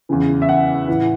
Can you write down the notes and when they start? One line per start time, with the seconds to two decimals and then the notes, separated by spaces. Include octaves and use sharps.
0.09 E2 C#3 E3
0.42 E5
0.49 F#5
0.88 A2 E3